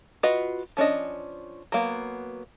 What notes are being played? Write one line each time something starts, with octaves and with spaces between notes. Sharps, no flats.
F4 F#4 B4 D#5
F3 C#4 D4 D#5
F#3 A#3 B3